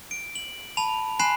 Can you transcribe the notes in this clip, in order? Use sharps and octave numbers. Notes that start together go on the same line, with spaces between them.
D7
F#7
A5 B5 F7
G#5 B5 C6 F#6 C7 E7